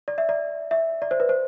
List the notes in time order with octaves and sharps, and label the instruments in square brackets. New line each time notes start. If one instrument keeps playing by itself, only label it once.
[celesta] D5
E5
D5
E5
D5
C5
B4
C5